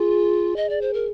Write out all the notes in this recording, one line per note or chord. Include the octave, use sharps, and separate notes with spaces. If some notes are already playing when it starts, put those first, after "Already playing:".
Already playing: F4 G#4
D#5
D5
C5
A#4